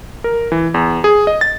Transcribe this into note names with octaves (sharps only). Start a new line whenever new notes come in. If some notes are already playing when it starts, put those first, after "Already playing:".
A#4
E3
E2
G#4
D#5
A6